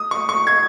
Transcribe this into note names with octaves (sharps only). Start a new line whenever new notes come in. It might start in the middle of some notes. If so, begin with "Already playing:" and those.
Already playing: D#6
C#6
C#6
G#6